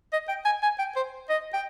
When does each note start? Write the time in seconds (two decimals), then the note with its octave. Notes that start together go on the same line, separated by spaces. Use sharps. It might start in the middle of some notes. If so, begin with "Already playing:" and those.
0.13 D#5
0.29 G5
0.45 G#5
0.63 G#5
0.79 G5
0.96 C5
1.30 D#5
1.54 G5